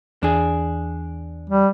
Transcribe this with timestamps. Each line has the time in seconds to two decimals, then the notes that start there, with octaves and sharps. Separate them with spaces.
0.23 E2 D4 G#4
1.50 G3